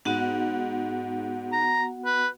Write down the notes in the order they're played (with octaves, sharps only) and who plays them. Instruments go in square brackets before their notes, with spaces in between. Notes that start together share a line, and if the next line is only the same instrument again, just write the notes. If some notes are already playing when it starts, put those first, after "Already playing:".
[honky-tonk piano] G#2 [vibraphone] B3 F#4 F#5
[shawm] A#5
B4